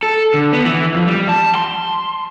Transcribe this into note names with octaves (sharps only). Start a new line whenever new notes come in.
A4
D3
B3
E3
F2
G3
A5
C6